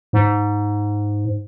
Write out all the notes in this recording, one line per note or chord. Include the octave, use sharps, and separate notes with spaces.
G#2